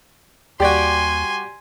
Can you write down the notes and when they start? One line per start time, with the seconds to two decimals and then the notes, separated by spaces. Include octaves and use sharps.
0.60 D#2 G3 F#4 G4 D5 G#5 C6